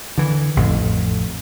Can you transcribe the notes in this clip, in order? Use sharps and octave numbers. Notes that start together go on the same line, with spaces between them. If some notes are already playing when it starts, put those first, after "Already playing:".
D3 E3
A1 F2 A2